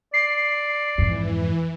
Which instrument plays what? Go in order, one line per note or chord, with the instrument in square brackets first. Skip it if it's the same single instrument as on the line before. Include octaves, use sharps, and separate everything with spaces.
[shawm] D5 [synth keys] C7
[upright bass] F2 G#2 [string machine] E3